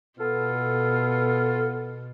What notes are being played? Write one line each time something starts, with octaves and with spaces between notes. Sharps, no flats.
B2 B3 F4 A4